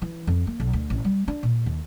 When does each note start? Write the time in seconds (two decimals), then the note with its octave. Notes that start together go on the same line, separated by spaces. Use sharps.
0.02 E3
0.27 F2
0.47 A#3
0.60 B1
0.73 D2
0.90 A1
1.04 G3
1.28 D4
1.43 A#2
1.66 D#2